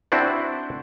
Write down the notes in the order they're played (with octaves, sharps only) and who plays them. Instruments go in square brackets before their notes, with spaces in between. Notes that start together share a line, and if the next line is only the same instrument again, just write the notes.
[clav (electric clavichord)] C4 D4 E4 F#4 C5 D5